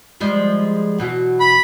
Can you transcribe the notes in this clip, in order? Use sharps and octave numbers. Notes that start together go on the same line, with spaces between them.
F3 G3 G#3
E2 B2 F#3
B5